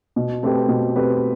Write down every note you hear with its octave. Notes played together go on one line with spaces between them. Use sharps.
B2
A3 C4 G4 B4
B2
A3 C4 G4 B4